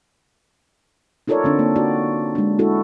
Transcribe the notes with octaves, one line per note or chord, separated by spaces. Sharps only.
D#4 F4 A4 A#4 C#5 D5
D3 C4 D4
A#3
D#4 F#4 D5
G#3 D4
D4 E4 F#4 A4